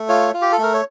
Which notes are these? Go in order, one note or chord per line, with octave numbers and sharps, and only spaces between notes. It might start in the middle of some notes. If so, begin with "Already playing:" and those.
Already playing: A3
F4 C#5
F4
G4
A4
A3 A#4
C#5